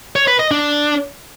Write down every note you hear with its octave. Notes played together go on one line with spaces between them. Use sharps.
C#5
B4
D#5
D4